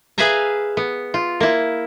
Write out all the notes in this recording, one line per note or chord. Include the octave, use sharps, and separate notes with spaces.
G#4 B4 E5 F5 G#5 A#5
B3
F4
A#3 E4